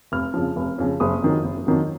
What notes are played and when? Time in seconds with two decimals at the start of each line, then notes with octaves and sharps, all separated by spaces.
0.12 F1 F6
0.34 F2 C#3 F3
0.56 F1
0.78 F2 C#3 F3
1.00 F#1 D#6
1.22 F2 D#3 F#3
1.45 F#1
1.67 F2 D#3 F#3